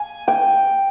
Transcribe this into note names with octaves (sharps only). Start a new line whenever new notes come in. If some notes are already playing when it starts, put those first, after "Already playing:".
Already playing: G#5
G5